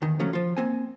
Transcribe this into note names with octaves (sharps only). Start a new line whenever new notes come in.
E2 D#3
C#2 F3 F#3 A3 C#4
F3 F4
A#3 C4 G#5